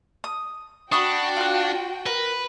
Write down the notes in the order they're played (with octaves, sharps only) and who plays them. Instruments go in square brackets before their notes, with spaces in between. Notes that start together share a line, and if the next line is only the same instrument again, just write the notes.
[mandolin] D#6
[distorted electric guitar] D4 [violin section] F#4 G5 [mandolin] B5 C#6 D#6
[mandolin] F4 F#6
[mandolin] A#4 [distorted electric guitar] B4